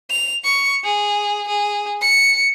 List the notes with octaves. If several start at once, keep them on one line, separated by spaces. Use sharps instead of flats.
F7
C#6
G#4
G#4
C#7